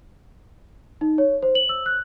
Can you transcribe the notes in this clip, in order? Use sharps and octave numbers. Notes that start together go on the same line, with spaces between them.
D#4
C#5
C5
F#7
E6
F#6